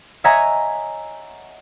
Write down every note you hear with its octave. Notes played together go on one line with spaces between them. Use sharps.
C#5 D#5 E5 F#5 G#5 A#5